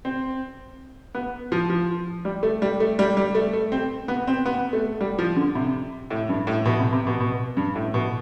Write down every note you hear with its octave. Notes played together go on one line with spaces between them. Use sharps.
C4
B3
F3
F3
G3
A3
G3
A3
G3
G3
A3
A3
C4
B3
C4
B3
A3
G3
F3
D3
C3
A2
G2
A2
B2
C3
C3
B2
B2
G2
A2
B2